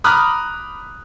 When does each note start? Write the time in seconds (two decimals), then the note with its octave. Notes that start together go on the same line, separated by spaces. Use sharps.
0.04 A#5 B5 D6 D#6 F6 F#6